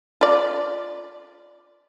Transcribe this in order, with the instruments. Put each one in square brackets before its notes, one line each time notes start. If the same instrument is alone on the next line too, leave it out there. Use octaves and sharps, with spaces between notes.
[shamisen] F4 D5